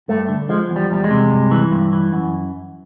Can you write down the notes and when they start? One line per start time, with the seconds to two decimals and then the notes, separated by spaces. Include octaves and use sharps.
0.08 G2 A3
0.28 D3
0.49 F3 G#3
0.70 E2
0.76 G3
0.91 E2 G3
1.04 G#3
1.11 C3
1.30 G2
1.51 E3
1.71 G2
1.93 E3
2.13 F#2